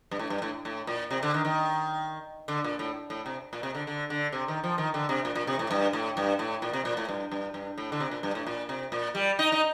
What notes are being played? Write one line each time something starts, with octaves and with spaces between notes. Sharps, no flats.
G2
A2
G2
A2
A2
A#2
C3
D3
D#3
D#3
D3
A#2
A2
A2
C3
A#2
C3
D3
D3
D3
C3
D#3
F3
D#3
D3
C3
A#2
A#2
C3
A2
G2
A2
G2
A2
A#2
C3
A#2
A2
G2
G2
G2
A2
D3
C3
A#2
G2
A2
A#2
C3
A#2
G3
D#4
D#4